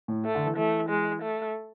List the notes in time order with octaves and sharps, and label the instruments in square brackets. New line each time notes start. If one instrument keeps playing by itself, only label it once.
[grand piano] A2
[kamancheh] A3
[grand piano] D3
E3
[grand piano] E3 [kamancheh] A3
[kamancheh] G#3
A3